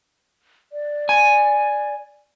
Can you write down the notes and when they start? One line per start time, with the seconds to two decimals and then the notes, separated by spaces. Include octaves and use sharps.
0.72 D5
1.09 G#5